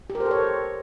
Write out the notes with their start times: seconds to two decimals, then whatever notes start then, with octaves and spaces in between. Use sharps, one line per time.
0.10 G4
0.15 A#4
0.20 C5
0.26 A4
0.31 C#5